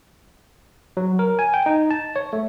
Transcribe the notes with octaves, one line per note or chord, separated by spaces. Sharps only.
F#3
A#4
G#5
G5
D#4
A5
C#5
A3